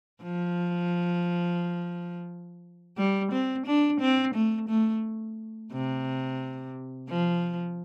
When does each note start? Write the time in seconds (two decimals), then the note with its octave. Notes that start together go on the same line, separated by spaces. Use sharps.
0.23 F3
2.97 G3
3.32 C4
3.66 D4
4.00 C4
4.34 A3
4.69 A3
5.72 C3
7.09 F3